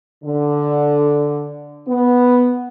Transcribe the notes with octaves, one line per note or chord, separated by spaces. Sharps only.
D3
B3